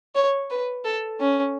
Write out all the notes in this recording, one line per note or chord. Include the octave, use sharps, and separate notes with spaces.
C#5
B4
A4
C#4